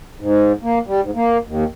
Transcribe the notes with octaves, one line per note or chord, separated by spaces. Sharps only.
G#2
A#3
G3
G#2
A#3
D#2